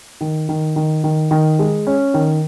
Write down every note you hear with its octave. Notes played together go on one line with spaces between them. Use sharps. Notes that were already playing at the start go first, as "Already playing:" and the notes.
D#3
D#3
D#3
D#3
D#3
G#3
C#4
D#3